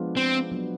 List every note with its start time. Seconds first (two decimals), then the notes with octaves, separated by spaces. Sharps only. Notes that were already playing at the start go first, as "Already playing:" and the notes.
Already playing: F3 G#3 B3 D4 F4
0.17 C4
0.52 F#3 B3 D4